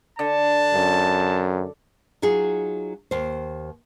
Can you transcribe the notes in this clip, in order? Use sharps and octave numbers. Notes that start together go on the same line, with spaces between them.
D3 A5
F#2
F#3 D#4 F4 G#4
D#2 C5